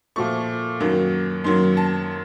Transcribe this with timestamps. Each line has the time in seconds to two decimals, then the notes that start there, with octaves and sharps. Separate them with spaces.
0.16 A#2 F3 A3 C#6
0.80 F#2 D#3 F#3 A#3
1.44 F#2 D#3 F#3 A#3 C6
1.77 A5